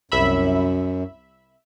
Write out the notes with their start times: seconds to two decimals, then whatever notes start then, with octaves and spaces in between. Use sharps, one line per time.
0.12 C2 F#2 E5 B5